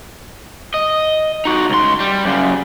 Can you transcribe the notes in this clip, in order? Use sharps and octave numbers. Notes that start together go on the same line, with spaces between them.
D#5
D#4 F#4
C#2 C6
G3
F#2 C#3